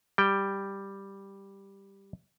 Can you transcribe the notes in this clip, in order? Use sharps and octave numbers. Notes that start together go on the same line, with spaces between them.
G3 G5